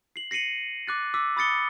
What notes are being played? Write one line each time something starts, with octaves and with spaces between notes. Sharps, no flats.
C7 F#7
A#6 C7 C#7 D#7 F#7
D6 F#6 A6
D6 E6 B6
B5 D#6 A6 C#7 G7